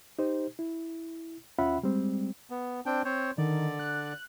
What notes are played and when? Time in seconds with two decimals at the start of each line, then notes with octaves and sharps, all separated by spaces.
0.19 D#4 G4 C5
0.59 E4
1.58 D#2 C#4 F4 E5 F#5 B5
1.83 G3 G#3 C4
2.50 B3
2.86 C4 D4 G5
3.05 C4 C5 C#5
3.38 D3 D#3 D5
3.79 F#6